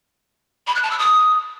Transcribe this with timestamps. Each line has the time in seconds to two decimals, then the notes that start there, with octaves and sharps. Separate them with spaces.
0.67 B5
0.75 F#6
0.83 A5
0.91 E6
0.99 D#6